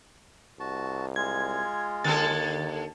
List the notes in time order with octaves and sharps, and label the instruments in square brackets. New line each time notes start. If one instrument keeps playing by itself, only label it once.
[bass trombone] C2 [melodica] F#4 A5
[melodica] G#3 F4 [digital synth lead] G#6
[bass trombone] D#2 [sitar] D3 A4 [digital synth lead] A6